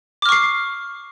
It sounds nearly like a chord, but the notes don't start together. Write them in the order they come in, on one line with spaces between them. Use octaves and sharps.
D6 F6 C#6 C7